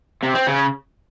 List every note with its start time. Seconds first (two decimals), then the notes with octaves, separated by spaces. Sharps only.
0.23 C3
0.35 C4
0.47 C#3